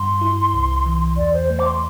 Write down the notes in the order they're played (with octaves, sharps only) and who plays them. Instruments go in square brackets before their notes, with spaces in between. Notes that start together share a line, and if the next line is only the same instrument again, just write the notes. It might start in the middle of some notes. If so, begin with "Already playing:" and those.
Already playing: [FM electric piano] G2 [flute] C6
[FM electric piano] E4
C2
E3
[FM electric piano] E2 [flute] D5
[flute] C5
[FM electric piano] A3 [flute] C5
[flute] D6
C6